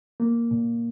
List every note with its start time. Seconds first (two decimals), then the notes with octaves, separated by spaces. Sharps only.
0.20 A#3
0.51 A#2